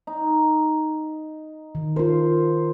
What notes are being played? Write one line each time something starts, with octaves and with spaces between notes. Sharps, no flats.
D#4
D#3
F4 A#4 C5 C6